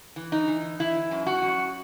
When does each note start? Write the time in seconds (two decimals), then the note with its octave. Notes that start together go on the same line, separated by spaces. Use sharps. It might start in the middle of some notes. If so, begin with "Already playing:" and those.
0.16 E3
0.32 D#4
0.48 E3
0.80 E3 E4
1.11 F#2
1.26 F#4
1.42 F#2